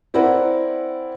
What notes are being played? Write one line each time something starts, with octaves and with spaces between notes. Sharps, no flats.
C4 E4 A#4 D5 F#5